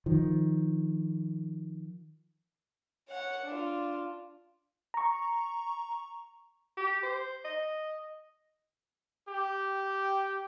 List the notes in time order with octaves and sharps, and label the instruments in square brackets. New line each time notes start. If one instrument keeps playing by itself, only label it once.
[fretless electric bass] D#3 F3
[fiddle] C#5 F#5
D4 F4
[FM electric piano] A#5 C#6
[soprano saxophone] G4
C5
D#5
[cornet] G4